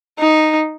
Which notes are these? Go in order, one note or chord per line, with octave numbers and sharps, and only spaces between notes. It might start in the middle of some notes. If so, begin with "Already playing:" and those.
D#4